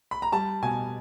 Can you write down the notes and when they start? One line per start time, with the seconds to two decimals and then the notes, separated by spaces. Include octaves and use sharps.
0.11 B5
0.22 A#5
0.32 G3 A5
0.62 B2 G#5